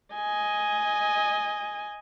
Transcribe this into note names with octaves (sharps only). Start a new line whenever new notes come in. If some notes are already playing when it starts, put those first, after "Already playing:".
D#5 G#5